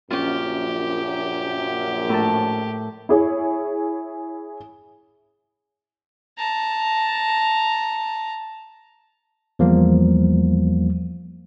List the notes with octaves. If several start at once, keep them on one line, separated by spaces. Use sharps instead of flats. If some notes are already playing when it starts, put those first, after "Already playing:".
A#1 F#2 C#4 F4 G4
A2 A#4 A5
E4 G#4 C#5
A5 A#5
E2 F3 G3 A#3